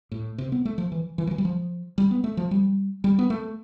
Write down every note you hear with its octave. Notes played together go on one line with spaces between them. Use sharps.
A2
C3
B3
A3
F3
E3
E3
F3
E3
G3
F3
G3
B3
A3
F3
G3
G3
B3
A3